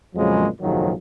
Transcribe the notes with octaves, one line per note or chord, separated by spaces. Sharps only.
F2 A#2 C#3 F3 F#3 G#3
F#1 B1 G#2 D#3 F3 F#3